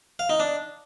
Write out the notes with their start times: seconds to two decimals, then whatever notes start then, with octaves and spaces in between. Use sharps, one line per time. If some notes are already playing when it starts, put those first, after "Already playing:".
0.19 F5
0.30 D#4
0.40 D4